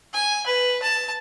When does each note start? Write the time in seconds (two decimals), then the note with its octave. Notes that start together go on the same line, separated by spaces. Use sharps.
0.13 G#5
0.46 B4
0.82 A5